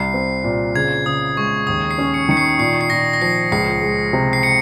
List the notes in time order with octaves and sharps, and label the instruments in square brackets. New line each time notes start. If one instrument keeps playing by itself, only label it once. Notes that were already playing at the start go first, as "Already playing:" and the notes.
Already playing: [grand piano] C2 [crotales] C7
[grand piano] C4
A#2
[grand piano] C#3 [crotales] G#6
[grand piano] C#3 [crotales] D#6
[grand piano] G#3 [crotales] C#6
[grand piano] D#2 [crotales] D#6
[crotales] C7
[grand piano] C#4
[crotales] C#7
[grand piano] D#3 [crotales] C#7
[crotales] C7
[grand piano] A#2 [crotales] C7
[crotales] C7
[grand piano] A#2 [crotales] A#6
[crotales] A#6
[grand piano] F3 [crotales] C7
[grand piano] C#2 [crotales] C7
[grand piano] G#3
C3
[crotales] C7
C#7